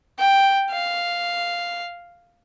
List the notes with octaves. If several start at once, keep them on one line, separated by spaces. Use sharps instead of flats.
G5
F5